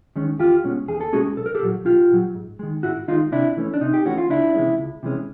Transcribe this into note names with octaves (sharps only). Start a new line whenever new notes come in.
D#3 G#3 C#4
E2 F4 G4
B2 G#3 C#4
E2 G#4
A4
B2 G#3 C#4 F#4 G#4
B1 A4
A#4
G4 A4
A#2 F#3
B1 F4 G4
A#2 F#3
G#2
D#3 G#3
G#2 E4 F#4
D#3 G#3 D#4 F4
C3 D4 E4
E3 A3 C#4
D4
C3 D#4
G4
E3 A3 C#4 F#4
F4
C#2 D4 E4
C3 E3 G#3 C#4
C#2
C3 E3 G#3 C#4